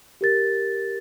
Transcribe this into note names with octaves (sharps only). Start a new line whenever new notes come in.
G4 A#4 A6